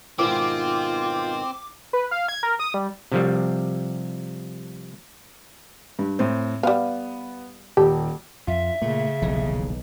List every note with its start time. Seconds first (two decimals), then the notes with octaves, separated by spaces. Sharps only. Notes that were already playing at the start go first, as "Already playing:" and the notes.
0.19 G#2 B2 D#3 C4 F4 D6
1.93 B4
2.11 F5
2.28 G#6
2.43 A#4
2.59 D#6
2.74 G3
3.12 C3 F3 G3
5.99 G2
6.19 A2 C4
6.63 G3 B3 F5
7.77 D#1 G4 A4
8.47 F2 F4 E5
8.82 A#2 C#3 A3
9.22 D#1 B1 E3